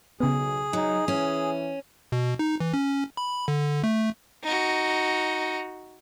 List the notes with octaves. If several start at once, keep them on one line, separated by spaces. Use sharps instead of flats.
B1 C#3 B3 G#4
F#3 D#4
E3 C#4
B2
D#4
E3
C#4
B5
D3
A3
D#4 F#4